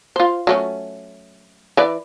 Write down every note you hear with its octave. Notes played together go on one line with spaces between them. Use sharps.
F4 C5
F#3 A3 C#4
E3 B4 D5